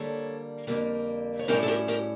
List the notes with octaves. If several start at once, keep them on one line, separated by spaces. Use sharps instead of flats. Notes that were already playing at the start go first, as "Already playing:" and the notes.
Already playing: D3 G3 A#3 A4 C#5
F2 D3 G3 A#3
C#5
A2 G3 C#4 E4 G4 A#4
A4
G4 A#4
G4 A#4